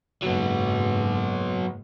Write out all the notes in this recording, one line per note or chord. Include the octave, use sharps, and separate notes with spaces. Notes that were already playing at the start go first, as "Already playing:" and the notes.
F#1 G#2 F#3 B3